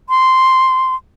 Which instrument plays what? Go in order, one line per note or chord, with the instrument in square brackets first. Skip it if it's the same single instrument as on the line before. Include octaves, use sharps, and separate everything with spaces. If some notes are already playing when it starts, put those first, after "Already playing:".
[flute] C6